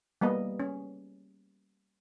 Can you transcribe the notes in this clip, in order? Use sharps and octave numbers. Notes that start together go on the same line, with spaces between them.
G3 A#3 B3 D#5
C#4